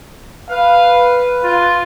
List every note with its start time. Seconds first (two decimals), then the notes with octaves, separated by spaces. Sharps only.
0.50 B4 F5
1.44 F4